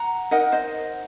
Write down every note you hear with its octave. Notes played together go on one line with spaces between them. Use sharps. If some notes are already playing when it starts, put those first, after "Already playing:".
Already playing: F#5 A#5
D#4 A#4 D#5 F#5
C5 D#5